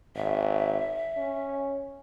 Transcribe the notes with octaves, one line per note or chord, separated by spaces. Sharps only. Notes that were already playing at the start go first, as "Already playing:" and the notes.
G#1 E5
C#4